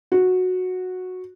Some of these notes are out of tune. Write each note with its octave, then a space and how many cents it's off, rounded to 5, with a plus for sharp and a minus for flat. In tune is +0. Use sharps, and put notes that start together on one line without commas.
F#4 -10